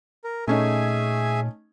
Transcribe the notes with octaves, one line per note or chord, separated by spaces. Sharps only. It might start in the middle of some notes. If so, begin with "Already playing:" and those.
A#4
A#2 A3 C#4 D#4 G#4 E5 G#5